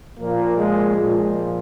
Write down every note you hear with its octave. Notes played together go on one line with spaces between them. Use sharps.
A#2 F3 A#3
G#3
A#2 F3 G#3